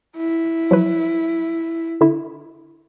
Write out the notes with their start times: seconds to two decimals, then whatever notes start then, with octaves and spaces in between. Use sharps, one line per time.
0.17 E4
0.71 F3 F#3 B4
2.01 D3 E4